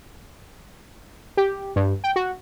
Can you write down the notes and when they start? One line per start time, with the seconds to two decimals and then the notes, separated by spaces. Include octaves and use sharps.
1.37 G4
1.76 G2
2.04 G5
2.16 F#4